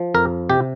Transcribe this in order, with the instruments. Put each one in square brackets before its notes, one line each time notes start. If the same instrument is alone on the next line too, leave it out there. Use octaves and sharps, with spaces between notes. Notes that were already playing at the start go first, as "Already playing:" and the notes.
Already playing: [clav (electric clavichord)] F3
F2 A#4
C3 G4